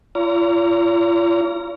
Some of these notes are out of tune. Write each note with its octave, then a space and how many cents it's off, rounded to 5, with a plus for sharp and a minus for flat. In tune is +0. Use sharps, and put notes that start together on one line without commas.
F4 -40 C#5 +45 A#5 +0